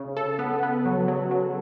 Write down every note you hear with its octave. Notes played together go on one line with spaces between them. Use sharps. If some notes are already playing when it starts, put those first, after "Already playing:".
Already playing: C#3
A4
B3
B3
F#3
F#3
F#3